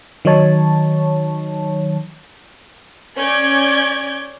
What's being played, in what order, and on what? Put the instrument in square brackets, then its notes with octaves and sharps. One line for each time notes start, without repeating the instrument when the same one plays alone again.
[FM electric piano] D#3 F#3 D#4 C#5 A5
[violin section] C#4 D5 G6 G#6